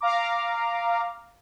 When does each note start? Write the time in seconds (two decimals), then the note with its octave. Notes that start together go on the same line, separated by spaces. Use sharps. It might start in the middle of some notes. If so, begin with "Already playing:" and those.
0.01 F5 A#5 D6